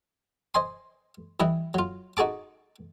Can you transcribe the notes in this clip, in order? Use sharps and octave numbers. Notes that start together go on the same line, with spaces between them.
C5 D#5 G#5 C6
E3 G3 E4 D#5
F#3 F4
D#4 F#4 G#4 A5 D6